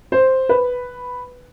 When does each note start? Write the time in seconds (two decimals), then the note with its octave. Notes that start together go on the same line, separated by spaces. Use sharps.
0.12 C5
0.49 B4